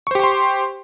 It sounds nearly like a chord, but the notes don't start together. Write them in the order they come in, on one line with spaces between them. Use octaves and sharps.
C#6 C5 G4 G5 C6